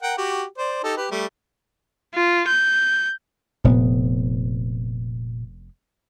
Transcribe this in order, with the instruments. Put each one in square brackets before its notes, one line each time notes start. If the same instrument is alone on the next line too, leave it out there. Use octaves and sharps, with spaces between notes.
[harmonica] A#4 F#5 G5
F#4 G4
C5 D5
D#4 G4 A4
G4 B4
G3 A3
[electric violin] F4
G6
[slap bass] F1 B3 [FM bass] A#2